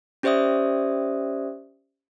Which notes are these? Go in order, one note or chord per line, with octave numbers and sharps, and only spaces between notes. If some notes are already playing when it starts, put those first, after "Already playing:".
C#4 G4 C5 D5 E5 D#6